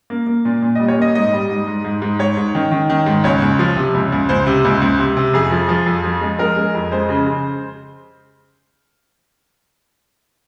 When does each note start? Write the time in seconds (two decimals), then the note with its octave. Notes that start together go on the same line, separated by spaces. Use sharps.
0.10 A#3
0.27 A#3
0.45 A#2
0.62 A#2
0.75 G3 D#5
0.88 C#5
0.97 A#3 D#5
1.15 G#2 D#5
1.33 G3
1.50 G#2
1.67 G#2
1.85 G#2
2.02 G#2
2.19 G#2 C#5
2.37 G#2
2.55 D#3
2.72 D#3
2.90 D#3
3.06 G#2
3.24 C#2 C#5
3.42 C#2
3.59 F3
3.77 C3
3.95 C#2
4.12 C#2
4.29 C#2 C5
4.47 C3
4.65 C#2
4.82 C#2
4.99 C3
5.17 C3
5.34 F2 G#4
5.51 F3
5.69 F3
5.86 F2
6.04 F3
6.21 G#3
6.39 G#3 A#4
6.57 G#3
6.74 F2
6.91 G#3 C5
7.09 C#3
7.27 C#3